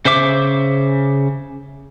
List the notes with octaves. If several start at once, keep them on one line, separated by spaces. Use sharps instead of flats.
C#3 C5 E5 D6